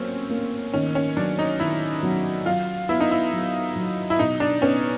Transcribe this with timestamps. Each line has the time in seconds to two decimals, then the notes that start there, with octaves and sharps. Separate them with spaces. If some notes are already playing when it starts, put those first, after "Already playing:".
Already playing: F#3 A#3 C4 C#4
0.30 A#3
0.74 D#3 C#4
0.95 C#4
1.17 F#3 D4
1.39 D#4
1.60 D#3 E4
2.03 F#3
2.46 F#3 F4
2.89 B3 E4
3.00 D#4
3.11 E4
3.33 F#3
3.76 F#3
4.10 E4
4.19 B2 D#4
4.40 D4
4.62 B3 C#4